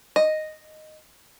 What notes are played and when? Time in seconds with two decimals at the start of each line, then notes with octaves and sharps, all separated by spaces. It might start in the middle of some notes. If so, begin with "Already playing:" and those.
0.16 D#5